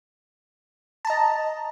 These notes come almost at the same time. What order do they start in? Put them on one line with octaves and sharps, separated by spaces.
A5 A#5 D#5